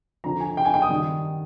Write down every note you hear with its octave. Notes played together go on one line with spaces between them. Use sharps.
F2 D3 F3 A#5
G#5
G5
G#5
G5
D#6
G2 D#3